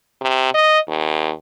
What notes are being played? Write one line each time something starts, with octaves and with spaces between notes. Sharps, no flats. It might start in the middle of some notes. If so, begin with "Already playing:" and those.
C3
D#5
D#2